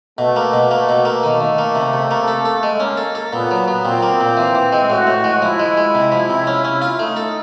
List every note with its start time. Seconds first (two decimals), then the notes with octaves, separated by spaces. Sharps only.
0.18 B2 A3
0.36 A#3
0.53 B2
0.71 A3 A#3
0.89 B2
1.05 A#3
1.23 D#3 A3
1.41 D#3
1.58 A#3
1.75 C3
1.93 C3
2.11 A#3
2.28 A4
2.45 A4
2.63 G#3
2.80 A#3 C#4
2.97 A4
3.15 A4
3.33 A#2 B3
3.51 F#3
3.68 F#3
3.85 A#2 C4
4.02 A#3
4.21 A#2
4.37 E3
4.55 E3
4.72 G#3
4.90 A2 F#4
5.07 A2
5.24 G#3
5.42 F3 E4
5.59 G#3
5.77 G#3
5.95 C3
6.12 F3
6.30 C3
6.47 C#4
6.64 C#4
6.82 F4
6.99 A3 D#4
7.17 A4